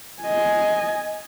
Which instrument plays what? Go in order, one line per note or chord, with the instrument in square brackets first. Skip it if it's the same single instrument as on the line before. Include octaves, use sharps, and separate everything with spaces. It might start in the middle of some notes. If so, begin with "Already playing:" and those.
[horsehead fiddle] D#5 G#5